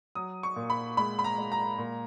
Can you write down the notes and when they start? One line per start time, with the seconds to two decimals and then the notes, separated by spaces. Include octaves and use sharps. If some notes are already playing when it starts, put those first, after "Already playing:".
0.15 F#3 D#6
0.43 C#6
0.56 A#2
0.70 B5
0.97 G#3 B5
1.19 B5
1.24 A#5
1.38 G#3
1.52 A#5
1.78 A#2